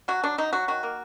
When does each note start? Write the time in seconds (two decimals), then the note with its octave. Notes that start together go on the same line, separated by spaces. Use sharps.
0.08 F#3 F#4
0.24 F#3 D4
0.38 F#3 D#4
0.53 F#3 F#4
0.68 D#3 F#4
0.83 A#3